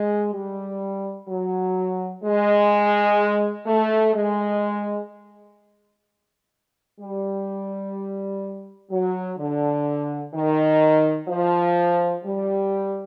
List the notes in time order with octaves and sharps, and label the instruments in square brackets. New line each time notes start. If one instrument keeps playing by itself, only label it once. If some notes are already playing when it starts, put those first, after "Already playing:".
Already playing: [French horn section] G#3
G3
F#3
G#3
A3
G#3
G3
F#3
D3
D#3
F3
G3